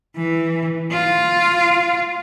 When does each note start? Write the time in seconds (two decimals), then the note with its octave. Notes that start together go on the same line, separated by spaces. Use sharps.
0.17 E3
0.92 F4